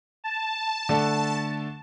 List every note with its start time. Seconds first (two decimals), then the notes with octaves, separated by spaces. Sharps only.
0.24 A5
0.89 D3 A3 D4